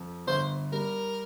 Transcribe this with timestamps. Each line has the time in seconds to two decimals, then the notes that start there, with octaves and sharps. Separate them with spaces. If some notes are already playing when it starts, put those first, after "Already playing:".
Already playing: F2
0.27 G1 C5
0.72 G3 A#4